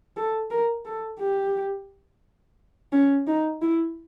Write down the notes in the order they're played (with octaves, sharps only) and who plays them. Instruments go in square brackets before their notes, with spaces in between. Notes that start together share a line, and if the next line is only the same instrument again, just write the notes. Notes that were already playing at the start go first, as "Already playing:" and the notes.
[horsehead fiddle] A4
A#4
A4
G4
C#4
D#4
E4